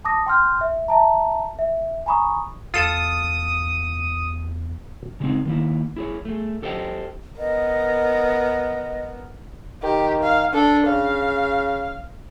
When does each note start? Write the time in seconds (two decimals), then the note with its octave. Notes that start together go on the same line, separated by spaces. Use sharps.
0.05 A5 D6 D#6 A#6
0.26 G5 C6 F6 G6
0.61 E5
0.88 E5 A5 A#5
1.59 E5
2.06 G#5 A#5 B5 C#6 D#6
2.74 E2 F4 A4 D#6
5.20 C#3 F#3 G#3 B3 C4 D#4
5.45 D#3 A#3 E4
5.96 E4 G#4 C#5
6.25 A3 G#4
6.62 G4 A4 C5 D#5 F5 G5
7.39 B3 A#4 D#5
9.83 D#3 G4
10.23 F5
10.53 D4 A4
10.87 C#3 F5